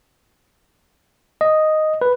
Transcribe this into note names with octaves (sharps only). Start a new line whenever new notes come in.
D#5
B4